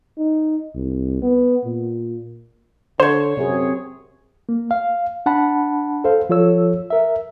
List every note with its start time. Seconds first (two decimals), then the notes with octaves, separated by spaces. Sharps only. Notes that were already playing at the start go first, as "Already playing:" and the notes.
0.18 D#4
0.75 C2
1.22 B3
1.65 A#2
3.00 D3 C5 C#5 C6
3.37 F#2 C3 C4 G#4
4.49 A#3
4.71 F5
5.26 D4 F#5 A5 B5
6.04 A4 C5 F5
6.29 F3 F4 A4 C#5 E6
6.90 A#4 E5